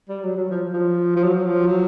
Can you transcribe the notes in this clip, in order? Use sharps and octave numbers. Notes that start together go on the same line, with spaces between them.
G3
F#3
F#3
F3
F3
F3
F#3
F3
F#3